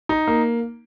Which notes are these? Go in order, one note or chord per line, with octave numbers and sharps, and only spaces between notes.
D#4
A#3